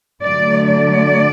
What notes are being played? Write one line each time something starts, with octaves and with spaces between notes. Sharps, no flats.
D3 F#3 A3 D5
D5